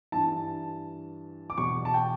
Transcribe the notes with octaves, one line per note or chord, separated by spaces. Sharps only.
G2 E3 A5
D6
E2 B2 C#6
A5
G5